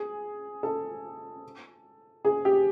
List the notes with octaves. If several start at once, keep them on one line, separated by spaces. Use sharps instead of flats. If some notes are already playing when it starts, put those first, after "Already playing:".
Already playing: G#4
A4
G#4
G4